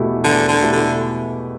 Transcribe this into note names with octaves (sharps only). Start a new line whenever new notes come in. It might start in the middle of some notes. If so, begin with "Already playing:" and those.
Already playing: E2 B2 A3 E4 G4
E2 D3
D3
B2 A3 E4 G4
D3